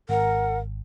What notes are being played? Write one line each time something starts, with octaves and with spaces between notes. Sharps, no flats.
G#1 A#4 F#5